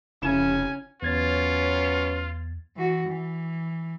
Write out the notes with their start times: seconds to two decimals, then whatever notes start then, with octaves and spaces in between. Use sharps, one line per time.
0.22 F1 C#3 C#4 E4 G#5 E7
1.02 E2 F#3 C#4 F4 B4 G#6 A6
2.76 E3 F#4
3.07 E3